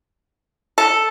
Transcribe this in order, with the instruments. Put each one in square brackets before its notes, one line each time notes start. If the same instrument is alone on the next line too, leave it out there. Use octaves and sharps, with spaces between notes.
[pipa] A4